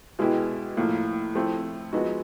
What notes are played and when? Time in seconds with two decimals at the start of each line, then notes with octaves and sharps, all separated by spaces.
0.19 B2 G#3 B3 E4 G4
0.77 A2 F3 A#3
1.35 F3 A3 C4 E4
1.93 F3 G#3 B3 D#4 F#4